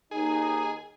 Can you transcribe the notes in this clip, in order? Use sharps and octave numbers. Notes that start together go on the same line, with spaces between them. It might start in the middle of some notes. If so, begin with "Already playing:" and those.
D#2 D#4 G#4